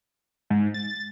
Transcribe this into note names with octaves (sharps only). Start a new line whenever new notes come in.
G#2
A6